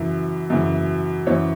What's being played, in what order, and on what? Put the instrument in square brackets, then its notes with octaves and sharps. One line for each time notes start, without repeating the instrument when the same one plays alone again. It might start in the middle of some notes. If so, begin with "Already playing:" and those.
Already playing: [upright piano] F#2 C#3 E3
F#2 C#3 E3
F#2 E3 C#5